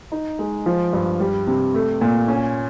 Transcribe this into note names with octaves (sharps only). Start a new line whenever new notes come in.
D#4
G#3
F3
G2
G3
C3
A3
A#2
C#4